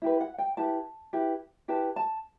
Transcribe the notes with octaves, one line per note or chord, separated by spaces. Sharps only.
E4 G4 B4
F#5
G5
E4 G4 B4 A5
E4 G4 B4
E4 G4 B4 A5
A5